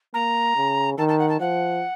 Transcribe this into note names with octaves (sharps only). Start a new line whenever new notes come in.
A#3 A#5
C#3
D#3 A5
A5
F#5
A5
F3 F#5